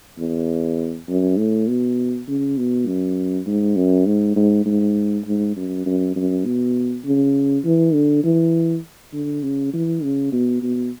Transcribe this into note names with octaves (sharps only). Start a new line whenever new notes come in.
E2
F#2
A2
B2
C#3
B2
F#2
G#2
F#2
G#2
G#2
G#2
G#2
F#2
F#2
F#2
B2
C#3
E3
D3
E3
D3
C#3
E3
C#3
B2
B2